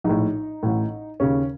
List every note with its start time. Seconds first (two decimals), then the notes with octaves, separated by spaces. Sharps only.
0.04 A#1 A2 D#4
0.63 A1 A2
1.20 D#2 C#3 C#4